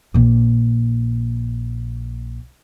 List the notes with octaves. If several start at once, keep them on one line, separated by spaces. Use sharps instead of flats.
A#1 A#3